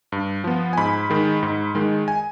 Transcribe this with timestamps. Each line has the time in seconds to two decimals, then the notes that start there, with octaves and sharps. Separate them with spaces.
0.12 G2
0.44 F3 B3
0.73 G#5
0.78 G#2 B5
1.10 D#3 G#3
1.43 G#2
1.75 D#3 G#3
2.08 G#5